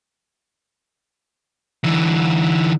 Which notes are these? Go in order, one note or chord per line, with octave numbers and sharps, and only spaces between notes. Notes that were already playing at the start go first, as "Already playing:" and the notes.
D3 E3